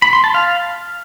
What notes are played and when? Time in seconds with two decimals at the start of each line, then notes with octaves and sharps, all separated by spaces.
0.02 B5
0.13 C6
0.24 A5
0.34 F5